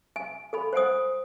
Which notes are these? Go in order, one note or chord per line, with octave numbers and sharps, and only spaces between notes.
G#5
A4 G#5 B5
C5 F#5 G#5 D#6